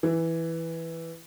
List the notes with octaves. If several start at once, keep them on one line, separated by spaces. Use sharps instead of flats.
E3